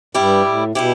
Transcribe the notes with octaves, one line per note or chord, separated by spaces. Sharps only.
G2 G3 E4 G4
A2
B2 G3 E4 G4